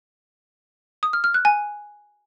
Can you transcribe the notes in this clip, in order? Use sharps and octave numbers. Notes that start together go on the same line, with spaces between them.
D#6
F6
F6
F#6
G#5